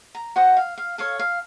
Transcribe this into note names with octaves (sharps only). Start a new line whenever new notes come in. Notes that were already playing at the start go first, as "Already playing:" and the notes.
A#5
F#4 C5 D#5 F#5
F5
F5
A4 C#5 F5
F5